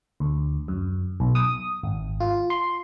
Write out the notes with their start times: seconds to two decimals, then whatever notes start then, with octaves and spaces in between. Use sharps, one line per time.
0.20 D2
0.68 F#2
1.20 B1
1.35 D#6
1.83 G#1
2.20 F4
2.50 C6